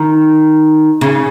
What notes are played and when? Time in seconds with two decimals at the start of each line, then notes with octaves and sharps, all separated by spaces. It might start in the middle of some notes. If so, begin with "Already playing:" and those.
Already playing: D#3
1.01 C#3